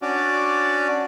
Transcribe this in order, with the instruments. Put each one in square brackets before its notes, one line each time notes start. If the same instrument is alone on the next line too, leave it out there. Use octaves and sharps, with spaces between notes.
[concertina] C#4 D4 F#4 D5